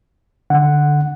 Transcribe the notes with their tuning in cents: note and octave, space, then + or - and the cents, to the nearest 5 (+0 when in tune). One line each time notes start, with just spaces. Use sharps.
D3 +0 F#5 +0